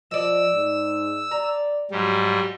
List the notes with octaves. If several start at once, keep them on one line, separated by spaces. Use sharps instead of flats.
F3 D5 D#5 E6
G#2
D5 A#5
G#2 F#3 G3